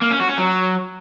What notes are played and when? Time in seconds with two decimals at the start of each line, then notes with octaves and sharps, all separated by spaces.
0.01 A#3
0.11 C#4
0.20 F#4
0.29 C#4
0.38 F#3